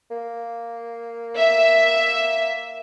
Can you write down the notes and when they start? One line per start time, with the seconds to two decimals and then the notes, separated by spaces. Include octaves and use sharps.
0.11 A#3
1.37 E5